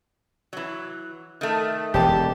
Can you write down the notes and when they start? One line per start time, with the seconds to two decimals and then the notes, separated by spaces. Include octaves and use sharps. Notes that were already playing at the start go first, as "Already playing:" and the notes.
0.53 E3 F#3
1.41 D#3 A3
1.94 E1 E3 G4 A5